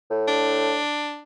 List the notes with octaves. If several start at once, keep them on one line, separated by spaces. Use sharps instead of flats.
A2
D4